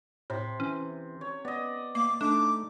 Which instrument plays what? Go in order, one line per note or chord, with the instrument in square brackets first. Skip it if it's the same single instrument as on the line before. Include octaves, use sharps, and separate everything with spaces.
[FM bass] A2 [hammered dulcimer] C3
[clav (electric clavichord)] E3 [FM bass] C#4
[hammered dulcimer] C#5
[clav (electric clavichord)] B3 [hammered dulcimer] D5 D#5
[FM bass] A#3 [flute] D6
[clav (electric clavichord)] A3 D#4 [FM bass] D4 [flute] D6